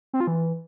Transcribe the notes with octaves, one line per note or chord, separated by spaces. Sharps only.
C4
F4
E3